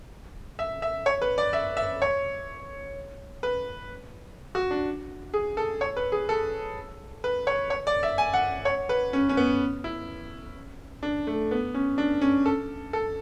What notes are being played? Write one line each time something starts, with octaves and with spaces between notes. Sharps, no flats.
E5
E5
C#5
B4
D5
E5
E5
C#5
B4
F#4
D4
G#4
A4
C#5
B4
G#4
A4
B4
C#5
C#5
D5
E5
G#5
F#5
C#5
B4
C#4
C#4
B3
E4
D4
A3
B3
C#4
D4
C#4
A4
A4